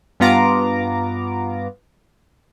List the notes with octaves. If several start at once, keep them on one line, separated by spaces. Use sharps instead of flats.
G2 B3 F4 A#5 D6